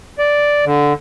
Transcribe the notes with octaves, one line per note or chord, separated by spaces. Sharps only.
D5
D3